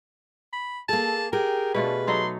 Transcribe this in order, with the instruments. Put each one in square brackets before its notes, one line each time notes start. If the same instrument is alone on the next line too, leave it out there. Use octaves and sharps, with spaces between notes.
[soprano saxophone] B5
[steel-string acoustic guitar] A#3 G#4 [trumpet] A4 [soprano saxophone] A5
[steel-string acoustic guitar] G4 G#4 [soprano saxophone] A#4 [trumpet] G5
[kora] B2 A3 F4 [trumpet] D4 [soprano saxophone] B4
[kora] F#3 D#4 A4 [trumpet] C6